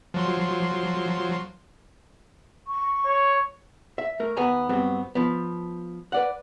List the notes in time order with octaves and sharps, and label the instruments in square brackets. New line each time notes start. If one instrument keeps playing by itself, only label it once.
[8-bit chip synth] F3 F#3 C6
[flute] C#6
[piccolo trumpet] C#5
[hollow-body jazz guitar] E5
A3 A#4
D#2 B3 G#5 A#5
G2 F#3 B3 C4
F3 B3
B4 D5 F#5